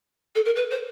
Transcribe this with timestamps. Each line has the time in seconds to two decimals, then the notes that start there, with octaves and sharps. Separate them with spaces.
0.35 A4
0.45 A#4
0.55 B4
0.71 C5